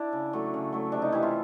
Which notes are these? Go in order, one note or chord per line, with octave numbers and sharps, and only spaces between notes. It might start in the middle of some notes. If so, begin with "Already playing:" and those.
Already playing: D4 E4
C#3
F#3 A3
C#3
F#3 A3
C3 D4
D#4
E3 G3 E4
F4